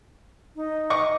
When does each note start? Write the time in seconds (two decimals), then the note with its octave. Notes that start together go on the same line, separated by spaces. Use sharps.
0.56 D#4
0.90 D#5 C#6 D6